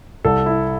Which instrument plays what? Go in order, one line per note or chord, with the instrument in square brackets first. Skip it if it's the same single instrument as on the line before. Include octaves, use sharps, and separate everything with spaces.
[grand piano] C2 A4
E4